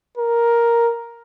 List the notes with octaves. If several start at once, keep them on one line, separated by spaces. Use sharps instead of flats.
A#4